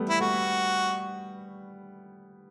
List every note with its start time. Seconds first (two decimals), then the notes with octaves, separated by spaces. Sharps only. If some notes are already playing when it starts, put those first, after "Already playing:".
Already playing: G3 A3 B3
0.09 E4
0.20 A3 F#4